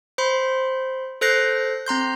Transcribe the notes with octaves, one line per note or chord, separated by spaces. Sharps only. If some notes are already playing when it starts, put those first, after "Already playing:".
C5 B5 C6
A4 C5 F#6 G6 A#6 C7
C4 A#5 C6 G6